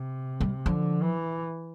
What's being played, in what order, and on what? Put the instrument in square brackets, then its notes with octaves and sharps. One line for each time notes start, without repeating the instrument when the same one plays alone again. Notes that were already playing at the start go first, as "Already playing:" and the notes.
Already playing: [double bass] C3
[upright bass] G3
[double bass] D3 [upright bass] F3
[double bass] E3